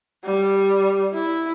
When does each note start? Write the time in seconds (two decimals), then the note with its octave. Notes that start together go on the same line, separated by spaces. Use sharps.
0.25 G3
1.14 E4